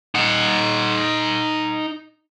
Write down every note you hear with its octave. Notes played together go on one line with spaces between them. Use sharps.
D#4 F#5